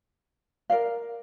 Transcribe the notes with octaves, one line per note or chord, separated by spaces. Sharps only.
A#4 D5 F5